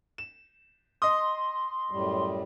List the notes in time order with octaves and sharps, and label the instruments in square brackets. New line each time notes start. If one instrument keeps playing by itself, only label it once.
[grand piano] E7
[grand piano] D#5 D#6 [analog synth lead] C6
[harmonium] F#2 A2 G3